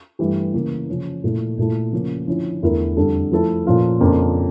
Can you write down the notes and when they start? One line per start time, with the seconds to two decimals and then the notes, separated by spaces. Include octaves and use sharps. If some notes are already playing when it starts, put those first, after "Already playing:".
0.19 G2 E3 A3 E4 G4
0.54 C#3 E3 A#3
0.88 C#3 F3 C#4
1.24 A#2 A3 E4
1.58 A#2 A3 E4 A4
1.93 C#3 F3 A#3 C#4
2.27 D3 F3 C#4 E4
2.62 E2 D3 A3 E4 A#4
2.97 F2 D3 G3 D4 A4
3.31 F3 A3 E4 A4
3.66 A#2 F3 C#4 F4 A4
4.00 F2 C#3 F3 A#3 D4